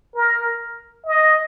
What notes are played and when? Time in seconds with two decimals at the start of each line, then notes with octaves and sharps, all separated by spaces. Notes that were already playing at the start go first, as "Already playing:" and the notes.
0.15 A#4
1.06 D#5